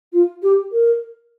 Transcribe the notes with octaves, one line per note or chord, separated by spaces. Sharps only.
F4
G4
A#4